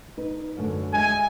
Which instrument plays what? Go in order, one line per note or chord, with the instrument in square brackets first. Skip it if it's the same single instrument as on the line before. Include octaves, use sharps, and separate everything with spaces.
[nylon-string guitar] D#4 B4
F#2 D3 A3
[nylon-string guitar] G#3 E5 [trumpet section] G#5